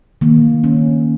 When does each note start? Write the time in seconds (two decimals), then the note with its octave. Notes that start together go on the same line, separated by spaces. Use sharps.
0.21 D#3 A#3
0.64 C#4